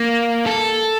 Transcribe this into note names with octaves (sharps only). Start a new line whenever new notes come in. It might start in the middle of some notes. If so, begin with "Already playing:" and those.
Already playing: A#3
A4